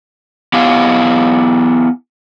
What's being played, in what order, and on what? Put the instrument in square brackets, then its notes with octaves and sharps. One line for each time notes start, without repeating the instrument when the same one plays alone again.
[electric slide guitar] B3 E4 G4 F5